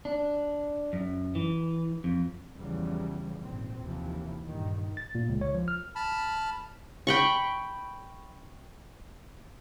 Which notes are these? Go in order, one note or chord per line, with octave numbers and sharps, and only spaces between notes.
D4
F#2
E3
F2
E2 C#3 E3 F3 G3
G#1 A#2 C4
D#2 C3 E3 F3
G2 A#2 D#3
A6
A#2
C#2
C#5
F3
F6
A5 B5 F6
G5 B5 C#6